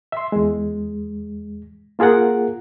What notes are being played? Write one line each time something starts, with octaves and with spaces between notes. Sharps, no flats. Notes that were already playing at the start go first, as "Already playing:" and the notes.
E5 C6
E2 G#3
A#3 F4 G#4 A#4 F#5